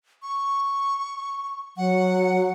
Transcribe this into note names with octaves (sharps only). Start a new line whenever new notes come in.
C#6
F#3 F#5